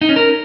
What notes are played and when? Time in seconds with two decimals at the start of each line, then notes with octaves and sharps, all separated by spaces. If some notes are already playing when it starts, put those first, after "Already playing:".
0.01 D#4
0.09 C#4
0.16 A#4